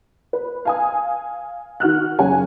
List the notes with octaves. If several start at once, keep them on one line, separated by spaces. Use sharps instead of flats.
B4
F5 G#5 D#6
D#3 F#4 F6 F#6
F#1 C#4 G#4 F#5 G#5